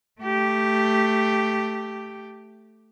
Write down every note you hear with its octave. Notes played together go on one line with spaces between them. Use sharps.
A3 G4